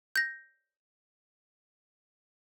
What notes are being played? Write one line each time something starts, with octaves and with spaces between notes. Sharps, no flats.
G6 A#6